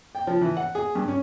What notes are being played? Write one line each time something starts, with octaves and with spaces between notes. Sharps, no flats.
G5
F3
E3
F#5
G#4
G2
C#4